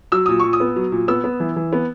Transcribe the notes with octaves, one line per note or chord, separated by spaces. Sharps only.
F#3 E6
A#2 D#6
A#2 C#6
D#6
B3
F#3
A#2
B3 E6
B3
E3
E3
B3